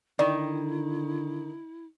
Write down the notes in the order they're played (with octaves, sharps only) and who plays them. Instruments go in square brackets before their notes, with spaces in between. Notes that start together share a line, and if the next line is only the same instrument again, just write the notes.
[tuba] D3 [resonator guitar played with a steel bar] D#3 [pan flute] E4 [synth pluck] D5